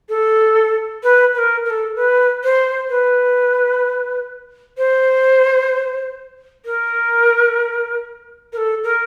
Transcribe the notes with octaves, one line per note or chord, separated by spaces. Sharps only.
A4
B4
B4
A#4
A#4
A4
B4
C5
B4
C5
A#4
A#4
A4
A#4